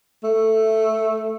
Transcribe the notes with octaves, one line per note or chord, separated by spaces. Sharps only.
A3